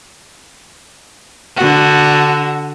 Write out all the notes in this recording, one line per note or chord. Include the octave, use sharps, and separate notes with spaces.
D3 F#4